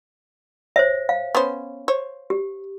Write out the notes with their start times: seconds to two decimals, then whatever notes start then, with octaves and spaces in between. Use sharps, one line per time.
0.76 C5 C#5 E5
1.09 F5
1.35 B3 C#4 C5
1.88 C5 C#5
2.30 G4